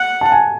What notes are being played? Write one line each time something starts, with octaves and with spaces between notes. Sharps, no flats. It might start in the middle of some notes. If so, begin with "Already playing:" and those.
Already playing: F#5
A5
G#5